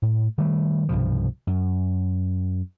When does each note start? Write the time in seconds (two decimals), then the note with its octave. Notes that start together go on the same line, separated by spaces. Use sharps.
0.02 A2
0.38 D#3 G3 A3
0.89 C2 G2 B2 F3
1.47 F#2